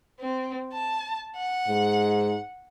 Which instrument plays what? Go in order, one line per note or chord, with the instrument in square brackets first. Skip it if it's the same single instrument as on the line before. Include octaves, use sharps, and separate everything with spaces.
[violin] C4
A5
F#5
[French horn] G#2